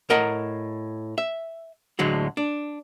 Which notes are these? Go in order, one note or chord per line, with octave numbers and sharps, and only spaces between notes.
A2 A#4 D#5 F#5 A#5
E5
D2 A2 D3 F#3 G#3
D4